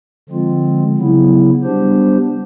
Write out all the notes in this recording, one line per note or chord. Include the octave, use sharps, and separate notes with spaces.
D3 F3 G#3 C4 F4
C#3 F#3 B3 E4
G3 B3 D4 G4 C5